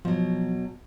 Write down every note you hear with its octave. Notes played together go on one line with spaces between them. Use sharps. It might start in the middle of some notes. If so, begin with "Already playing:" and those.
B2 F3 F#3